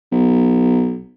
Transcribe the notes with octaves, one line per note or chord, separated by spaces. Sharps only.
B1